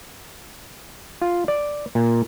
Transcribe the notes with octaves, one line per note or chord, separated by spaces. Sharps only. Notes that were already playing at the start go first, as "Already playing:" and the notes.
F4
D5
A#2